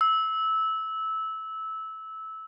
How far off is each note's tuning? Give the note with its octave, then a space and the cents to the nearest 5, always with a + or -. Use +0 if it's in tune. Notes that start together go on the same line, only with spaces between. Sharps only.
E6 -15